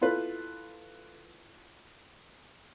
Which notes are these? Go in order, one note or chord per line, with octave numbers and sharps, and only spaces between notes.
E4 F4 A4 B4